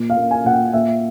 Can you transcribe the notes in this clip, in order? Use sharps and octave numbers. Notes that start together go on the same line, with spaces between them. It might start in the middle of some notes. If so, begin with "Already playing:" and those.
Already playing: A#2
F5
A#3
G#5
A#2 F#5
G5
A#2 E5